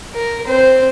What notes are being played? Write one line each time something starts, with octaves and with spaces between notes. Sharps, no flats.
A#4
C4 C5